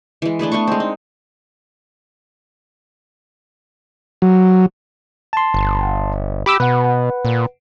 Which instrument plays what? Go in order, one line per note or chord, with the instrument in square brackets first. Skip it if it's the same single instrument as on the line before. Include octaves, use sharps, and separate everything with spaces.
[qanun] E3 G#3
A3 D4 G#4 B4
A3 B3 D4 C#6
G#3 C4
D#4
[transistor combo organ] F#3
[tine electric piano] A5 C6
[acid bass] G1
[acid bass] G4 [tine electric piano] B5 D6 E6
[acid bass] B2 [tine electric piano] B4 F#5
[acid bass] A#2